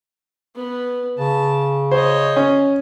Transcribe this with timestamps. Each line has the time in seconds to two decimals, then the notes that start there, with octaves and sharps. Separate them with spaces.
0.55 B3 B4
1.18 C#3 A5
1.91 C5 C#5 D#5
2.37 C#4